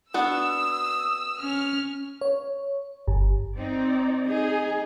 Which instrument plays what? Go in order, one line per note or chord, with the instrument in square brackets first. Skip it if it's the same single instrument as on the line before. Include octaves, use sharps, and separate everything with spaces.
[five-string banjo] B3 D4 F#4 [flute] D#6 [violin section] E6
[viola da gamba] C#4 [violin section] F6
[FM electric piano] C#5
G1
[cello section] C4 D#4 D5
[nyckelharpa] D#4 [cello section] G#4